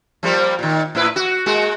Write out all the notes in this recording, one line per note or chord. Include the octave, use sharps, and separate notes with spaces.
F3 G3 A#3
A#2 D#3
A2 E4 B4
F#4
G#3 A#3 F#4